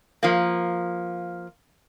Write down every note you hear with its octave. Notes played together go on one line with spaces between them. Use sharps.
F3 A#3